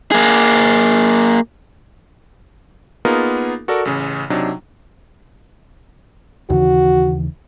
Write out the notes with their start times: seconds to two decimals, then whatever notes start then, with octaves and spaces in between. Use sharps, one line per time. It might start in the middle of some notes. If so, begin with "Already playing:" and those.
0.12 A#3 G#4
3.05 A#3 B3 D#4 F4 G#4 A#4
3.68 F#4 A4 A#4 D5
3.85 A1 C#3
4.30 C3 F#3 D4 D#4
6.50 D#2 C#3 E3 F#4